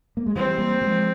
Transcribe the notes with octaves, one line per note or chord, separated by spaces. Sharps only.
A#3
G#3
E3 G3 C4
G3 A#3
F3 G#3